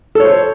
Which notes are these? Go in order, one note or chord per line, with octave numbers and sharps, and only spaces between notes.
A4 C5 C#5